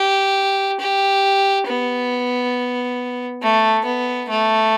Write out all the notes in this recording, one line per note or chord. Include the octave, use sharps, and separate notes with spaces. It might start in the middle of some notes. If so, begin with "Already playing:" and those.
Already playing: G4
G4
B3
A3
B3
A3